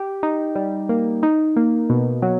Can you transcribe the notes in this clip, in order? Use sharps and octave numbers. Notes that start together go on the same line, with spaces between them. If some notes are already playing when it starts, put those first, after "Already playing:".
Already playing: G4
D#4
G3
A#3
D#4
A#3
B2
F#3